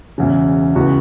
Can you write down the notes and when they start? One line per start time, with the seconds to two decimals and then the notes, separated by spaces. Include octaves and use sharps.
0.18 E1 E2 C#3
0.75 C#2 C#3 E3 B3 F#4